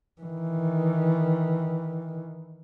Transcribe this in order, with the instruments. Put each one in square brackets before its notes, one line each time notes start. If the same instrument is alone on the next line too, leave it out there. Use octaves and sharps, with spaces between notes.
[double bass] D#3 E3